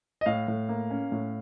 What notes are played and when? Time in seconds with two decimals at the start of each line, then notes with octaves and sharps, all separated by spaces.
0.21 D#5
0.26 A2 F5
0.48 A2
0.69 A#3
0.90 C#4
1.12 A2